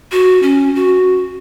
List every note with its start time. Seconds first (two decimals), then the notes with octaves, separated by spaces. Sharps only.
0.12 F#4
0.43 C#4
0.75 F#4